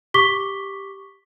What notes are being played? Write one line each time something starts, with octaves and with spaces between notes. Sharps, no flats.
G4 C#6 D6 B6 G7